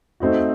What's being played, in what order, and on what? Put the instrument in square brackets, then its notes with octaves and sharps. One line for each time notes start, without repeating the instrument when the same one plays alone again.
[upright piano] A3 C4 D#4 F#4